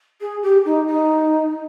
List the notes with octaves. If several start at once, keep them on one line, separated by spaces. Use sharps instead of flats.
G#4
G4
D#4
D#4